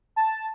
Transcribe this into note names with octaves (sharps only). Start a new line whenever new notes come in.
A5